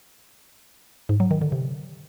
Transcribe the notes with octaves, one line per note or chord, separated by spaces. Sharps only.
G#2
F#3
D#3
D3
C3